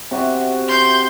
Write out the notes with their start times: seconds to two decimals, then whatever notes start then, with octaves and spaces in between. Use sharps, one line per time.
0.11 C3 F#4 E5
0.69 C6 G6